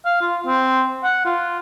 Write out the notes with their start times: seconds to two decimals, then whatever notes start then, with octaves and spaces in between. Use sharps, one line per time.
0.05 F5
0.21 F4
0.46 C4
1.04 F#5
1.25 F4